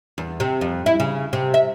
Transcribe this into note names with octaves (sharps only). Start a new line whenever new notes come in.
E2
C3
F2
E4
C#3
C3
E5